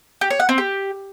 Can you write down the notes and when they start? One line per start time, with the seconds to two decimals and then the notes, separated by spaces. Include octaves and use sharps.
0.21 G4
0.30 C#5
0.40 F#5
0.49 C4
0.58 G4